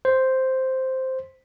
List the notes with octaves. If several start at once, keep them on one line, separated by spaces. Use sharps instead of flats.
C5